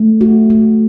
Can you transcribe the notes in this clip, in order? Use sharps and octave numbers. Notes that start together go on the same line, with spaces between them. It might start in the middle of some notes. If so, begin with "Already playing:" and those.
Already playing: A3
F#4
A3